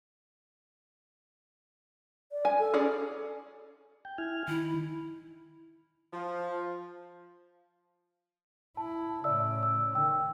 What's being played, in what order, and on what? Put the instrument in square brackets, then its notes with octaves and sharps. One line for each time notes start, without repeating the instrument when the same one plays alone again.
[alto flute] D5
[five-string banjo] G#5
[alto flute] A4
[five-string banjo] C#4 G#4 D5
[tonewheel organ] G5
E4 G#5 F6
[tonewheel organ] D#3 [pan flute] E4
[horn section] F3
[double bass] E4 [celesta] A5
[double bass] A2 C#3 [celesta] D5 E5 E6
[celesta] E6
[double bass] D#3 [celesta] G5 E6